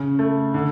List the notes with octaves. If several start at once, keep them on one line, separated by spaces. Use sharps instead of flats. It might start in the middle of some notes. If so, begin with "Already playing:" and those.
Already playing: C#3
A3
D3